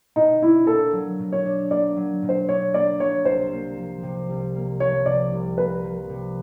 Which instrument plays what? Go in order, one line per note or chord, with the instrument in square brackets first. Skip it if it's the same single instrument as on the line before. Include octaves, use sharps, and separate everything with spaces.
[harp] B2 [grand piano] D#4
[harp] D4 [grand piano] E4
[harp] A#3 [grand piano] A4
[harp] F#3
B2
[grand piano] C#5
[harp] D4
[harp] A#3 [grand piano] D5
[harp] F#3
B2
[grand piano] C5
[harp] D4 [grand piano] C#5
[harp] A#3 [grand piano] D5
[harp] F#3 [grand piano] C#5
[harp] C2 [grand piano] C5
[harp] A#3
F3
C3
C2
A#3
[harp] F3 [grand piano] C#5
[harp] C3 [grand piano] D5
[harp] C2
[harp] A#3 [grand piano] B4
[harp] F3
C3